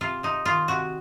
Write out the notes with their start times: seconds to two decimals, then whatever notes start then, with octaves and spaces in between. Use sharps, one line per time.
0.01 C3 F4
0.23 C3 D#4
0.45 D#3 F4
0.68 C3 F#4